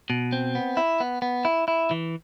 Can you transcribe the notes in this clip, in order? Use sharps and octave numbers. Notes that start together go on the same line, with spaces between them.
B2
C4
B3
E4
B3
B3
E4
E4
E3